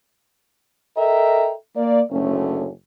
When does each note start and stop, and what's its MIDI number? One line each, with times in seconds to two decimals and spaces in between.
0.97 1.53 69
0.97 1.53 70
0.97 1.53 75
0.97 1.53 76
0.97 1.53 79
0.97 1.53 82
1.76 2.02 58
1.76 2.02 74
2.11 2.69 30
2.11 2.69 38
2.11 2.69 57
2.11 2.69 61